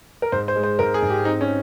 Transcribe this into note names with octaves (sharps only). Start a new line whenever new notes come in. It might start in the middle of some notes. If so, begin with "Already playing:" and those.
A#4
G#2 C5
C5
G#3
C5
G#2 A#4
G#4
G#2
G4
C4 D#4
C#4